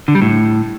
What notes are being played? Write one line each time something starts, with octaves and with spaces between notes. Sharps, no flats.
D3
G3
A2